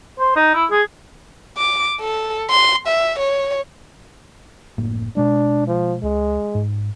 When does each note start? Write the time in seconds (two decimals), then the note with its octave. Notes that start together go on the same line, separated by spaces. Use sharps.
0.19 C5
0.36 D#4
0.54 E4
0.71 G#4
1.57 D6
2.00 A4
2.50 C6
2.87 E5
3.19 C#5
4.77 F#1 A2 A#3
5.17 B2 G#3 D4
5.67 F3
6.03 C#2 G#3
6.55 G#2